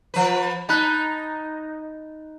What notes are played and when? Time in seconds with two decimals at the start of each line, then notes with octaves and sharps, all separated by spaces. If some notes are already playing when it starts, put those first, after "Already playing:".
0.14 F3 B4
0.69 D#4 A5 B5 F#6